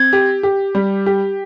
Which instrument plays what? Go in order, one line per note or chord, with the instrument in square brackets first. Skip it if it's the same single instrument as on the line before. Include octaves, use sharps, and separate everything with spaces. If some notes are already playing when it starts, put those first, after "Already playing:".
Already playing: [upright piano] C4 [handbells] G#6
[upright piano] G4
G4
G3
G4